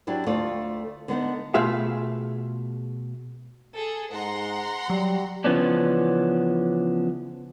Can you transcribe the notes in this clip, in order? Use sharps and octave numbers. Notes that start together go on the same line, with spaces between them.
F#3 D4 E4 G4
D2 A3 F4 D5
D3 B3 D4 D#4
B2 A3 F4 G#4 E5 F5
G#4 A4
G#2 F#5 A#5 C6
F#3 G3
C#3 E3 F3 B3 C#4 D4